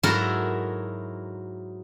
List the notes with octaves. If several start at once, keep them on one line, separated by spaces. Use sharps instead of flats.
G#2 F#3 E4 F#4 A4 A#4